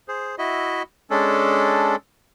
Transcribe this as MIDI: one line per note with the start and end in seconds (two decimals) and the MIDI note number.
0.08 0.35 68
0.08 0.35 72
0.38 0.83 64
0.38 0.83 66
0.38 0.83 75
0.38 0.83 76
1.10 1.96 56
1.10 1.96 61
1.10 1.96 62
1.10 1.96 69